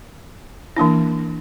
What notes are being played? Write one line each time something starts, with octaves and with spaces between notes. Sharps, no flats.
E3 A#3 D4 E4